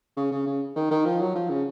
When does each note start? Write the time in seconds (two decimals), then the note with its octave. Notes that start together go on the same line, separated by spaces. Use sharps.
0.17 C#3
0.31 C#3
0.46 C#3
0.76 D#3
0.91 D#3
1.06 F3
1.20 F#3
1.35 F3
1.49 C#3